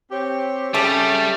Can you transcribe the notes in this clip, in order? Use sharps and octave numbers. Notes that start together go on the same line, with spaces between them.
C4 G4 C#5
C#3 G3 A3 G4 G#4